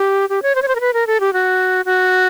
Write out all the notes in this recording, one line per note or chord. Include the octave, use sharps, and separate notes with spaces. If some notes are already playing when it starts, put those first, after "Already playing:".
Already playing: G4
G4
C#5
C5
C#5
C5
A#4
B4
A#4
A4
G4
F#4
F#4